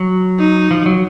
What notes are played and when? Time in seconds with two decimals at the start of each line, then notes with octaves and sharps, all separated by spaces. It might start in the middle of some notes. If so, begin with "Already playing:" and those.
Already playing: F#3
0.38 D#4
0.71 F3
0.86 F#3